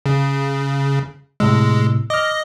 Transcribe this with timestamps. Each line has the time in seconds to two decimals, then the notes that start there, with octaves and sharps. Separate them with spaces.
0.06 C#3
1.40 A2 C3 G#3 E6
2.10 D#5 D6 F6